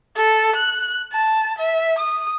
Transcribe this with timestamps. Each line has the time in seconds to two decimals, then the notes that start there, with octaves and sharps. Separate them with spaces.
0.16 A4
0.56 F#6
1.12 A5
1.58 E5
1.98 D#6